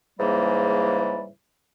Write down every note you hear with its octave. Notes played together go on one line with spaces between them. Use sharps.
G#2 C#3 E3 G3 A#3